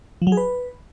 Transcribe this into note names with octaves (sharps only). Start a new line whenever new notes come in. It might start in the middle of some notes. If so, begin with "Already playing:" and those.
F3
F#3
G#4
B4